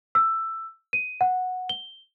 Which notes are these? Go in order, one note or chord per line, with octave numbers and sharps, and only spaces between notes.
E6
D#7
F#5
G7